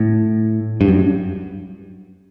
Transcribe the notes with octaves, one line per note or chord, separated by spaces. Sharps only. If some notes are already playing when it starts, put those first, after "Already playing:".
Already playing: A2
G2
F#2